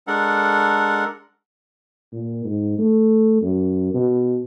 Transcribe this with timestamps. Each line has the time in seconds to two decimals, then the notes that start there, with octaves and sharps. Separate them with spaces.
0.07 G#3 D4 A4 A#4 F#5
2.12 A#2
2.44 G#2
2.78 A3
3.42 F#2
3.94 B2